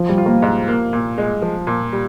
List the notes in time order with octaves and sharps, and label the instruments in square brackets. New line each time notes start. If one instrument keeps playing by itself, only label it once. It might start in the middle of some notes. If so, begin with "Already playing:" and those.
Already playing: [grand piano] F3
G3
[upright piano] F4
[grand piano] A#3
[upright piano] G#2
A#3
A#2
G#3
F3
A#2
G3